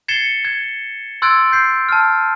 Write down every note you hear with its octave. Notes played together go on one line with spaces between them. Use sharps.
G#6 A6 C7 C#7 E7 G7
G#6
C6 E6 F#6 G#6 A6 D7
G6 C7
A5 F6